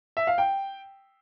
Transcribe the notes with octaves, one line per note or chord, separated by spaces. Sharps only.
E5
F5
G5